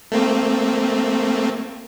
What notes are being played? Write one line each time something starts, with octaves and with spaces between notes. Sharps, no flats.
A3 A#3 C4